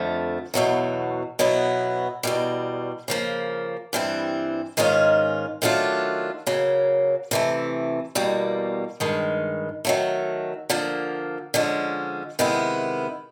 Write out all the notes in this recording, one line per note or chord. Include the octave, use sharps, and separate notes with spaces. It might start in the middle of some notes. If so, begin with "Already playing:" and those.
Already playing: F2 D3 F3 A3
E2 B2 F#3 A3
B2 F#3 B3 E4
E2 B2 G3
C#3 F3 A#3
G2 E3 G3 C4
G#2 D#3 G#3 C#4 F4
D#3 F#3 A3 D4 F4
C#3 F#3 A#3
C3 E3 A3
E2 B2 G3 A#3
G2 D#3 G#3
D#3 F#3 A3
D3 F3 A#3
D3 F3 G#3 C#4
C3 D#3 G#3 B3 E4